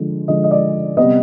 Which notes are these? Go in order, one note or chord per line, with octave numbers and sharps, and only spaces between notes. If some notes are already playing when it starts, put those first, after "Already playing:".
Already playing: D3 F3 G#3
D3 F3 G#3 D#5
D#5
D5
C3 G3 B3 D#5